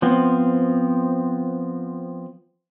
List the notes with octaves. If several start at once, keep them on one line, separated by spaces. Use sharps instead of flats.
F3 B3 C4